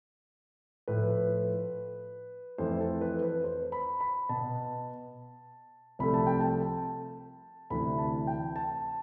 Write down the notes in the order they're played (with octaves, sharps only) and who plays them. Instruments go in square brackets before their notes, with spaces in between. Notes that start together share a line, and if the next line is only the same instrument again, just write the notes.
[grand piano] A2 F3 A3 B4
F2 E3 A3 C5
A4
B4
B4
C5
B5
B5
B2 B3 A5
C2 C3 F3 A3 B5
A5
G5
A5
D2 C3 E3 B5
A5
G5
A5